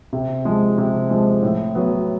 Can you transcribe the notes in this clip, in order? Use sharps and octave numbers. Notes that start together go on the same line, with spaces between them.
C3
F3 G#3
C3
F3 G#3
A2
F#3 B3